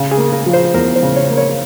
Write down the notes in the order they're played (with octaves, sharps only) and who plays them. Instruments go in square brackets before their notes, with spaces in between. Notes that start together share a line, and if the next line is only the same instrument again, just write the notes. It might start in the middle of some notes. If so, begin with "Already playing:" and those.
Already playing: [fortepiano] C#3
G#4
A#3
A#4
F3
C5
E2 A#4
C5
C#3
C#5
A#3
C#5